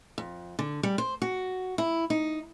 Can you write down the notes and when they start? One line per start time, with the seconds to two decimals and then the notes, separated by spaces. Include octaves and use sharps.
0.18 F2
0.59 D3
0.83 G3
0.98 C5
1.22 F#4
1.78 E4
2.10 D#4